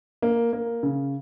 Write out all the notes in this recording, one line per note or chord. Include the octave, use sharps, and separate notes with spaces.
A#3
A#3
C#3